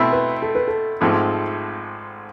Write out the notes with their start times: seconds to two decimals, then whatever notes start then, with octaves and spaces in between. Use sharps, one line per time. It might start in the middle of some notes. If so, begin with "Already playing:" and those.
Already playing: B2 A3 C4 E4
0.12 B4
0.42 A4
0.55 B4
0.67 A4
1.01 G#1 G#2 F3 A3 C4 G#4